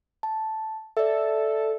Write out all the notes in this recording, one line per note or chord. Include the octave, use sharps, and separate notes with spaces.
A5
A4 D5 E5